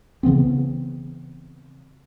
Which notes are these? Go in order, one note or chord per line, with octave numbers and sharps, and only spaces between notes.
C#3 E3 B3 C4